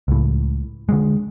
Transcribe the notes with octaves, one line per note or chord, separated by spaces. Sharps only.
C#2 A2
D3 D#3 G#3